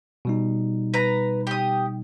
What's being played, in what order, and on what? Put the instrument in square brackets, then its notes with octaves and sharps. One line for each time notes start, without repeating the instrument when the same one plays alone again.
[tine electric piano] B2 G3 D#4
[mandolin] B4 A#5
G4 D#6